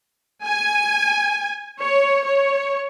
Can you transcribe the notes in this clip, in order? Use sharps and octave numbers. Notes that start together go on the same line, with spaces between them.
G#5
C#5
C#5